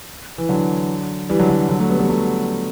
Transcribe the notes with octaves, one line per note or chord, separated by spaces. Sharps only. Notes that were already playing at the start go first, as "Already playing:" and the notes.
E3
D3 F#3
E3 G3
D3 F#3
D3 F#3
D3 F#3
F#3 A3
G3 B3
G3 B3
F#3 A3